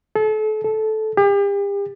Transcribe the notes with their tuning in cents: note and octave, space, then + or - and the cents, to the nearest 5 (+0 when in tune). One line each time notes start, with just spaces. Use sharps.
A4 -35
A4 -15
G4 +40